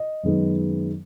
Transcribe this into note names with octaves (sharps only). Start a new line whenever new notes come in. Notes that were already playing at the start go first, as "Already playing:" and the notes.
Already playing: D#5
F#2 D#3 G#3 B3